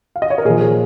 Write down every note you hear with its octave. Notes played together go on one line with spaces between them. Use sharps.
F5
D#5
C#5
A#4
A#2 F3 G#4
G#4